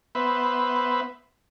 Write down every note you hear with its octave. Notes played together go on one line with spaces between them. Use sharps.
B3 B4 C5 E5